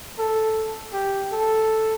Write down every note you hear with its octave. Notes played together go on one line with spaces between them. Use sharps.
A4
G4
A4